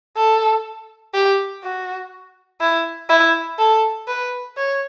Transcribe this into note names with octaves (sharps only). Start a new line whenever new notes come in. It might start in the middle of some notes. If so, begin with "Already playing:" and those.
A4
G4
F#4
E4
E4
A4
B4
C#5